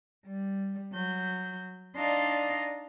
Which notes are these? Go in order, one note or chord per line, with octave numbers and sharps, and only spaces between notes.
G3
F#3 G6
D4 D#4 D5 D#5 F5 C6